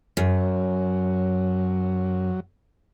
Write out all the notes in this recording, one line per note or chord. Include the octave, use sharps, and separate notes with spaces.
F#2 F#3